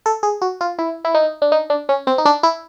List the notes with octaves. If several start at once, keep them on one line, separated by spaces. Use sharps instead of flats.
A4
G#4
F#4
F4
E4
E4
D#4
D4
D#4
D4
C#4
C4
D#4
D4
E4